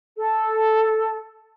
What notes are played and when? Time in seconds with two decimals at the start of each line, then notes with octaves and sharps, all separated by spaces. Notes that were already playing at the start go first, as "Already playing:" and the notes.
0.17 A4